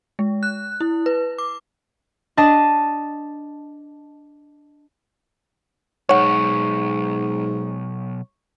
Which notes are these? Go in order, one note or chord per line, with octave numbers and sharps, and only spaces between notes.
G#3
F#6
E4
B4
D6
D4 D#5 A5
B1 G#2 C#5 F#5 C#6